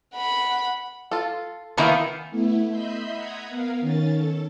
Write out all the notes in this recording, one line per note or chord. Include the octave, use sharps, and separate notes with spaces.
F#5 B5
F4 A4
D#3 E3 A#3 B3 E4 F4
A3 B3 E4
D#5 E5 B5 C6 G6
F#5 A#5 B5 D#6 G#6
B3 A#4 F5
D#3 C#4 A6
A4